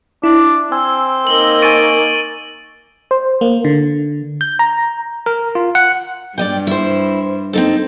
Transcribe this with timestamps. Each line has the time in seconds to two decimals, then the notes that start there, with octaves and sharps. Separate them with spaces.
0.24 D4 E4
0.72 C4 G#5 E6
1.27 A#3 D#4 F#7 G7
1.62 G#5 C#6 A6 D7 D#7
3.11 C5
3.41 A#3
3.65 D3
4.41 G6
4.59 A#5
5.26 A#4
5.55 F4
5.75 F#5
6.38 G2 D5 D#5 G5
6.67 E4 C5
7.53 C4 D#4 A4